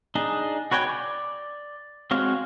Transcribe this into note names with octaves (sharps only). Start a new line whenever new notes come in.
D4 D#4 G#4
F#4 B4 C#5 G5 G#5
D5
G#3 C4 F#4 C#5 F5